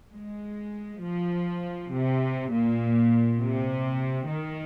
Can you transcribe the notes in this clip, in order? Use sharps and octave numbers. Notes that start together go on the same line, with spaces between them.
G#3
F3
C3
A#2
C3
D#3